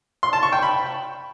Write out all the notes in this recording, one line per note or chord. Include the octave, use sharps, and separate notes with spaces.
C6
A5
C#6
G5
B5